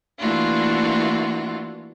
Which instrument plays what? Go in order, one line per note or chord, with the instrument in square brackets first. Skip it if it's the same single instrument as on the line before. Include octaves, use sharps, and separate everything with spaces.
[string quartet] E3 A3 A#3 D4 F4 F#4